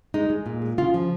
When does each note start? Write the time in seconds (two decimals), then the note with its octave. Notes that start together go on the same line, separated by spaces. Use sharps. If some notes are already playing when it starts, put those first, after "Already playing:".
0.14 G#3 D#4
0.30 G#3
0.46 A#2
0.62 G#3
0.78 C#3 F4
0.94 F3